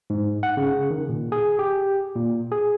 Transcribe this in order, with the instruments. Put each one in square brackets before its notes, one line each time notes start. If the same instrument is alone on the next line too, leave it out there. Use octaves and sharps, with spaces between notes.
[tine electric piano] G#2
F#5
C#3
D#3
A#2
G#4
G4
A#2
G#4